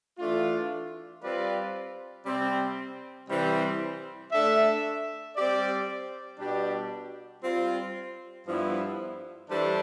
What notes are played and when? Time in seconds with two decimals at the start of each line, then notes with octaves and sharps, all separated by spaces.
0.18 E3 A3 D4 F4
1.22 G3 C4 F4 B4 D5
2.26 C3 G3 C4
3.29 C3 E3 G3 C4
4.32 A3 D4 A4 E5
5.36 G3 C4 G4 D5
6.39 B2 G3 D4 G4
7.43 G3 C4 F4
8.46 G2 F3 B3 E4
9.50 E3 G3 D4 A4 C5